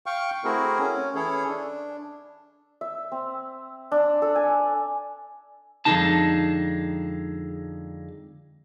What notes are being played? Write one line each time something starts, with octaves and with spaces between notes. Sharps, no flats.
F5 G5 C#6
A3 C4 E4 F#4 G#4 A#4
C#4
E3 C#4 E4 G#4 A4 C#5
D4
E5
C4
D4
A4
G#5
F2 D3 F3 G#3 D#4 A5